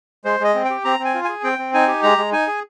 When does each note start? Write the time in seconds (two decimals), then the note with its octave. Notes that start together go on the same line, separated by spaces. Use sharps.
0.25 G#3 C5
0.40 G#3 D#5
0.55 C4
0.65 G5
0.70 G4
0.85 C4 A#5
0.99 C4
1.05 G#5
1.14 F4
1.25 G#4 G#5
1.43 C4 G5
1.59 C4
1.74 D#4 G#5
1.88 G4
2.03 G#3 A#5
2.18 G#3
2.32 D#4 G#5
2.47 G#4